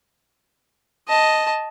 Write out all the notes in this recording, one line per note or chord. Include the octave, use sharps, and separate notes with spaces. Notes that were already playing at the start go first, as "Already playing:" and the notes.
D#5 A5